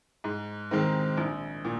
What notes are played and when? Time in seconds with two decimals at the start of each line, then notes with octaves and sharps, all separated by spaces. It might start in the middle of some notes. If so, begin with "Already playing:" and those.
0.24 G#2
0.71 D#3 G#3 C4 D#4
1.17 A#1
1.65 A#2